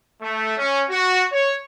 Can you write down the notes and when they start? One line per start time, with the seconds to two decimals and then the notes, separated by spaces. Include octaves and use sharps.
0.22 A3
0.58 C#4
0.90 F#4
1.32 C#5